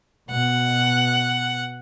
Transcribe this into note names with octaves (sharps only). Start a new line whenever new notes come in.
B2 F#5